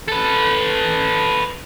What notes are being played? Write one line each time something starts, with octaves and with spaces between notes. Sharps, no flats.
A4 B4